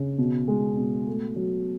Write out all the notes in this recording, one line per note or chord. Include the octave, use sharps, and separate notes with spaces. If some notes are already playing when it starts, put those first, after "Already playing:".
Already playing: C#3
B2
G#3
B2
A3
F#3